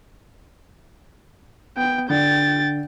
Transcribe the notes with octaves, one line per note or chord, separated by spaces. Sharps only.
B3 G5
D3 G5 A6